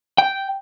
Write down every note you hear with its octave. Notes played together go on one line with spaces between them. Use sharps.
G5